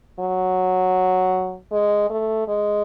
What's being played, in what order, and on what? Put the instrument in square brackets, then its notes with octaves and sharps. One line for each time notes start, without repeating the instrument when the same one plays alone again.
[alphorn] F#3
G#3
A3
G#3